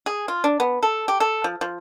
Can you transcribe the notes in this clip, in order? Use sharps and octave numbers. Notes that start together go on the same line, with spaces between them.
G#4
F4
D4
B3
A4
G4
A4
F3
F3